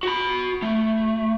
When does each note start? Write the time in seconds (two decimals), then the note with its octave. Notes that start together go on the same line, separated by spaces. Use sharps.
0.03 F#4 B5
0.62 A3